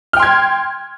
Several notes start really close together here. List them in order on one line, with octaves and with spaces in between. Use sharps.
F6 G5 C6 G#6